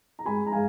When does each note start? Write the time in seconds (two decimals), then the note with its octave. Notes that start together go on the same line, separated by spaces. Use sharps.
0.19 A#5
0.26 G#3 G#5 B5
0.46 A#5
0.52 G#3 F5 G#5